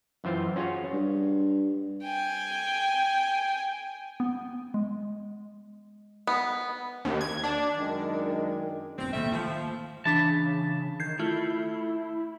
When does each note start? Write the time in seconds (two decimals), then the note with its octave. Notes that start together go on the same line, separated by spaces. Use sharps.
0.24 F#2 E3 F4 C5 F5 G5
0.56 C#4 F4 F#4 G#4 C#5
0.93 G2
2.04 G5 G#5
4.20 B3
4.74 G#3
6.27 B3
7.05 D#2
7.21 G#6
7.44 D4
7.77 F#2 D#3 G#3 D4
8.98 G1 F3 C4
9.13 D#2 A#2 G3 A3 E5
9.32 D#3 F3 A3
10.05 C#3 E3 D4 A5 B6
11.00 D#3 G6 G#6 C7
11.20 A3 E4 F4